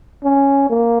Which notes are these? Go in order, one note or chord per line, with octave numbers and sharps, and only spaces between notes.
C#4
A#3